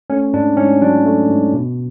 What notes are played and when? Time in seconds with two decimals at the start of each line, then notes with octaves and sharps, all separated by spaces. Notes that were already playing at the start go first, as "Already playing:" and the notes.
0.10 A3 C#4
0.34 G#2 D4
0.57 G#2 C#4
0.81 F#3 D4
1.05 A3
1.29 G#2
1.53 B2